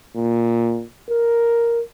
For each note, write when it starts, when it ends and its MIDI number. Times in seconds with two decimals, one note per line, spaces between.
0.16 0.84 46
1.10 1.81 70